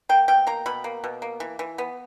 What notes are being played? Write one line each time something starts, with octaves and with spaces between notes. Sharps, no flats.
A#3 G5
B2 G5
A#3 A#5
B2 B5
A#3
B2
A#3
E3
E3
B3